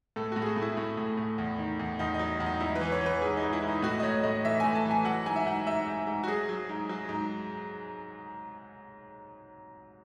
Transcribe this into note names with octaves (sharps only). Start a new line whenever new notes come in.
A2 A4
A2 F#4
G#4
F#4
A2
E4
A2
A2
A2
E2
D#3
E2
E2 D#4
D#4
F#3
E2
D#4
G#2 E4
B4
E3
C#5
E3 B4
G#2 G#4
D#4
G#2
E4
G#2
D#4
A2 F#4
D#5
A2 C#5
A2 D#5
E3 E5
A2 G#5
A5
E3
G#5
F#3 F#5
G#2 G#5
E5
G#2 F#5
G#2 E5
G#2
G#2
F#4
F#3 G#4
F#3
G#2
F#3
G#2